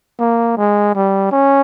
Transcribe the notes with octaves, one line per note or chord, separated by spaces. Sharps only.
A#3
G#3
G3
C#4